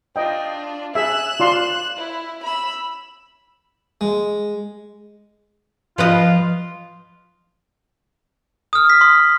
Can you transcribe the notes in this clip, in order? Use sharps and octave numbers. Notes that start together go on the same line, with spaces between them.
D4 F4 D#5 G5
G#4 E5 F#6 E7
F4 D5 C6
E4
B5 E6
G#3
F3 F4 B4 D#5
D#6 F6
B6
C6 D#6